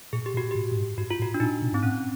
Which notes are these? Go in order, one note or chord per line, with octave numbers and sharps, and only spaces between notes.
A#2 G#4
G4
A#2
F#4
A2 G4
A2
G#2
G#2 F#4
F4
A2
F#4
D4
A#2 D#4
B2
G#2 C4
A2 C#4